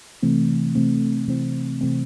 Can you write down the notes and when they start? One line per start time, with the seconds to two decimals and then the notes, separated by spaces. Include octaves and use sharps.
0.23 C3 E3 A3 C4
0.75 C3 E3 A3 C4
1.28 C3 E3 A3 C4
1.81 C3 E3 A3 C4